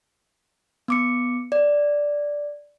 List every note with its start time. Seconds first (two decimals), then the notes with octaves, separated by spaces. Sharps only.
0.88 B3 D6 C#7
1.52 D5